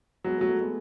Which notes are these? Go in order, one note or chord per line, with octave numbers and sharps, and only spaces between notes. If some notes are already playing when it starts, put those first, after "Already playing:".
F#3 G#3 B3
A3
F#3
A3
G#3 B3